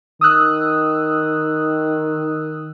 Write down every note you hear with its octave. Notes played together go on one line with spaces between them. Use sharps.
D#3 D#6 E6 F#6